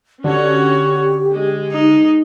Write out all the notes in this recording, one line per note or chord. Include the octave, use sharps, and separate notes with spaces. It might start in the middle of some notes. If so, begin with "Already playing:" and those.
D3 C#4 F#4 G4 C#5
G#3
D#4